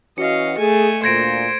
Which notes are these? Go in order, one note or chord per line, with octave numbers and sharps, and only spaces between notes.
E3 C#4 F#4 D#5 F5 C#7
A3 G#4 G#5
D2 A#2 C5 G#6 A#6 D7